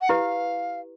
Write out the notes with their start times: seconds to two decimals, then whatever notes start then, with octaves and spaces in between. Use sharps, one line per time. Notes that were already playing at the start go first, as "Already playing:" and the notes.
0.01 F#5
0.09 E4 G4 B4 F5